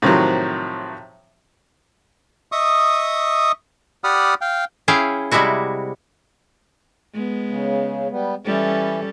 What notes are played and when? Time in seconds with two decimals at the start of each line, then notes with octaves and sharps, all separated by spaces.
0.02 A2 C3 D#3 F3 F#3
2.52 D#5 E5 C#6 D#6
4.04 G4 D5 F#5 B5 D#6 F6
4.41 F5 G5
4.88 C#4 E4 G#4 F5 G5
5.31 C3 G3 G#3 E4 F#4
7.14 G#3 B3
7.48 C#3
8.11 G3 B3
8.46 E3 G3 C#4 A4